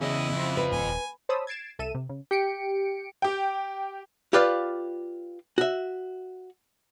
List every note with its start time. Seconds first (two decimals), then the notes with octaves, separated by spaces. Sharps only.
0.01 E2 C#3 E4 D#5
0.32 F2 F3
0.57 B4
0.72 D#1 G#5
1.29 C5 C#5 A5 B5 D#6 E6
1.47 G#6 A6 C7 D7 E7
1.79 C2 A4 E5 D#7 E7
1.95 C3
2.09 C#3
2.31 G4 C#7 D7
3.22 G4 G5
4.33 F4 G4 B4 D5 F5
5.58 F#4 E5